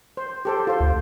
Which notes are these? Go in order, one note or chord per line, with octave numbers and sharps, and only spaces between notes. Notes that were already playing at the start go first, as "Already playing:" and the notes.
C5
G4 A4 C5
F4 C5
D2